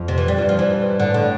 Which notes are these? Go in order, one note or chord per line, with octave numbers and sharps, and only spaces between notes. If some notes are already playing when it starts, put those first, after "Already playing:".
Already playing: F2
C3
E3
G3
G2 F3
F3
E3
A2 D3
D3